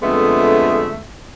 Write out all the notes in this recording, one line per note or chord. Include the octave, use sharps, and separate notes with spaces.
F2 D3 G#3 A3 B3 E5